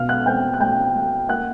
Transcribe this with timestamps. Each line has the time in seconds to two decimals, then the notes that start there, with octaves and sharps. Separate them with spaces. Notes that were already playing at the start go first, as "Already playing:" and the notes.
Already playing: B2 F5 F6
0.09 F#5 F#6
0.26 C4 G5 G6
0.54 F#6
0.60 A3 G5 G6
0.95 A3
1.29 A#3 F#5 F#6